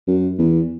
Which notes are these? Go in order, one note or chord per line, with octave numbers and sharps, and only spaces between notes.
F#2
E2